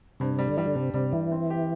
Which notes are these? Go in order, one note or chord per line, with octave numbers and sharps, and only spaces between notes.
G2 C3
G3
D3
E3 G3
D3
G2 C3
C3 G3
E3 G3
C4
G4